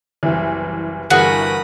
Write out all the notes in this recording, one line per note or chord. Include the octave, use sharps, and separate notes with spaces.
F#1 C2 E3
G1 E3 F#4 G#4 A#4 F#5 B5 D#6